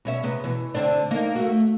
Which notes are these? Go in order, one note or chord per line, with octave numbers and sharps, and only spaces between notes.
B2 C#4 E5
C3 G#3 B3
B2 E3
D3 C4 D4
A#3 D#4
A3 F#4